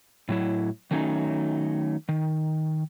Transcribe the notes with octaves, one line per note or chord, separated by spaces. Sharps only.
A2 F#3 E4
D#3 F#3 A3 C#4 D#4
D#3